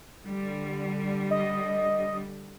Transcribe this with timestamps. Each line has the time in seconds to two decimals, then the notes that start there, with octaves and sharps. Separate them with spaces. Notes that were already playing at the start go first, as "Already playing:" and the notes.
0.23 D3 G3
1.31 D#5